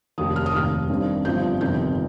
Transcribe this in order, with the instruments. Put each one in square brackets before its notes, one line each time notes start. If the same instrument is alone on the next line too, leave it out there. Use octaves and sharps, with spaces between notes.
[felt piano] F1 D#2 D#3 D#6
F6
D#6
F1 D#2 D#3 F6
G2 D#3 C4
G1 G2 F3 C4 G6
G1 F2 C3 D#3 G6